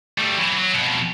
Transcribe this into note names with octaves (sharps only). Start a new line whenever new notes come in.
G3 A3
E3 F#3
F#3 F#4
F2 B2